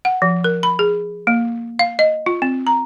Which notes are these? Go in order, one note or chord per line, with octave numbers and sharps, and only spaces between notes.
F#5
F3
A#4
B5
G#4
A#3
F5
D#5
F4
C4
A#5